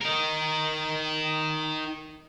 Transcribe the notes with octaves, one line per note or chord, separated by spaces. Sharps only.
D#4 A#4